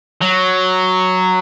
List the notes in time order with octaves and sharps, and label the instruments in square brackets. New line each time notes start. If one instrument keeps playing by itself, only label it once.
[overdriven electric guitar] F#3